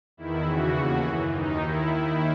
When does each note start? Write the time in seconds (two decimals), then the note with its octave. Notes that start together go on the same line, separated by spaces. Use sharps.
0.17 E2 D#3 E4
0.46 E2 C#3 E3 F#4
0.74 D#2 C#3 E3
1.03 F#2
1.08 E3
1.32 D#2 D#3 D#4
1.61 D#2 D#3 E4
1.90 D#2 D#3